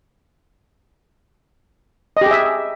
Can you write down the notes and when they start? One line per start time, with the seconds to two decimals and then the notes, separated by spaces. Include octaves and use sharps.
2.17 D#5
2.21 G4
2.26 G#4
2.31 E5